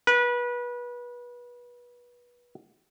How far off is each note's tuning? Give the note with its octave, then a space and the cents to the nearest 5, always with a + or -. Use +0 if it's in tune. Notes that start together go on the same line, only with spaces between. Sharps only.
B4 -25